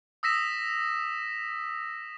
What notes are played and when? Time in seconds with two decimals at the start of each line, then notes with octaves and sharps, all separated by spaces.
0.23 D#6 E6 A#6 B6 E7